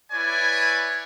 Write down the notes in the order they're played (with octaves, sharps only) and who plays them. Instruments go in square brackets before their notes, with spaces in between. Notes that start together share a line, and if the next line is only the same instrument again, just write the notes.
[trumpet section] E4 B4 C#5 D5 G#5